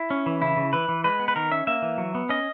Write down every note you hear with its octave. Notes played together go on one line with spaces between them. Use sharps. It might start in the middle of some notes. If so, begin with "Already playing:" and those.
Already playing: E4
C#4
E3
C#3 E4
C#3
E3 B4
E3
G#3 B4
B3
B4
D#3 A#4
C#4 E5
A#3 E5
E3
F#3
B3
C#4 D#5